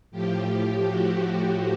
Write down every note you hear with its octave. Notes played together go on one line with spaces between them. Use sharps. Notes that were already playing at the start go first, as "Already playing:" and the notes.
A2 F3 G4
F#4
G4